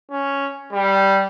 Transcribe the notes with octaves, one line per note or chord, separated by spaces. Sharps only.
C#4
G3